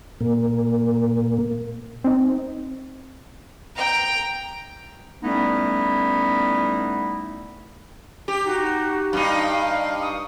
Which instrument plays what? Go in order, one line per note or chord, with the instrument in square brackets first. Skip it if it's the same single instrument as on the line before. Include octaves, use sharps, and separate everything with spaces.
[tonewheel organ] A#2 A#3
[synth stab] C4 D#4
[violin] G5 A#5
[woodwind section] G3 A3 B3 C#4 D#4 E4
[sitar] G4
[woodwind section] D#4 F#4
[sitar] G2 D#4 [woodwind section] F5
[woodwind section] C#6 D#6